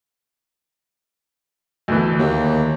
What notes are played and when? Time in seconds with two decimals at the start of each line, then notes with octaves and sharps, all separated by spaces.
1.88 D2 E3
2.19 D#2